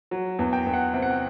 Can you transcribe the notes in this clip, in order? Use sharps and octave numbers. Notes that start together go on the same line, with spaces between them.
F#3
E2
G5
E2
F#5
C3 G5
F#5
G5